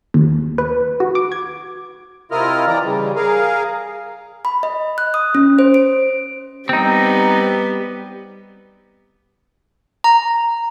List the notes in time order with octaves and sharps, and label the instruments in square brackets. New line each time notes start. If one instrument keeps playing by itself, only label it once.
[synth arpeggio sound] D#2
B4
F#4
D6
G#6
[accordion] C3 E4 F4 A#4 D#5 F6
E3 D5 A#5
C#3 G3
G#4 A#4 F5
[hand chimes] B5
D#5
F#6
D#6
C#4
C5
D7
[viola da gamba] G3 B3 [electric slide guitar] C4 D#4
[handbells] A#5